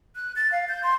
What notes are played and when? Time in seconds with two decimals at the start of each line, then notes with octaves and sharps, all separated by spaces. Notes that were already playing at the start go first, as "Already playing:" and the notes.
0.16 F#6
0.36 A6
0.52 F5
0.69 G6
0.83 C6